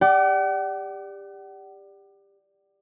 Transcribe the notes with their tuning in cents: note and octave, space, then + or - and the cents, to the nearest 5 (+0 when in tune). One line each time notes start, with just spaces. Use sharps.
G4 +25 D5 +0 F#5 +45